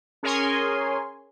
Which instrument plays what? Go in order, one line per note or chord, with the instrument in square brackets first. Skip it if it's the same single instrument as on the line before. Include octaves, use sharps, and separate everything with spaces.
[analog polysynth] C#4 G#4 A#4 C#5 G#5 C6